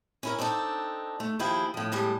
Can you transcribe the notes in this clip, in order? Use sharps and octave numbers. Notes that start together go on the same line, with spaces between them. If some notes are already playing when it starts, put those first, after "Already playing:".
C#4 E4 A#4
C4 D4 D#4 A4
A3
D#2 F3 E4 G#4 G5
A2 F3
A2 G3 G#3 A5